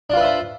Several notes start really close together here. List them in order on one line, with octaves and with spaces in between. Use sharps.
D4 F4 B4 E5 C5